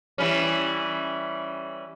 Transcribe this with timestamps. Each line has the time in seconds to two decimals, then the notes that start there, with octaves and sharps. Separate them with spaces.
0.18 E3 G3 C#4